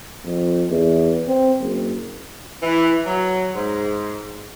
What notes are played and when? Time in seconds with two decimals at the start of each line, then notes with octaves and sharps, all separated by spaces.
0.24 F2
0.70 E2
1.28 C4
1.60 F#1
2.63 E3
3.07 F#3
3.55 G#2